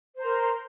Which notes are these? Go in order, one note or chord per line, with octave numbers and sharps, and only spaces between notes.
A#4 C5 A#5